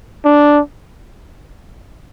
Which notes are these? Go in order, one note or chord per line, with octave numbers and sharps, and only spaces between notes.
D4